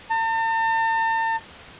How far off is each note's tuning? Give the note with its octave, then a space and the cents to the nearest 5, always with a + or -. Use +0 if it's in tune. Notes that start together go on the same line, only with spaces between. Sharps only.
A5 +45